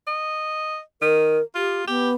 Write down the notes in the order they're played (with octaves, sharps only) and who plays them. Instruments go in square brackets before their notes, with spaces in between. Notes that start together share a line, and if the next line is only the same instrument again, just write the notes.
[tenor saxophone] D#5
[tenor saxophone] D#3 [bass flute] A#4
[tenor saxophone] F4 [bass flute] G4
[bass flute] B3 [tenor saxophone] G4